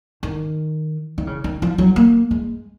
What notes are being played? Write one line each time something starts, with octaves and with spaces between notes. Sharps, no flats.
D#3
D#3
C#3
D#3
F3
F#3
A#3
G#3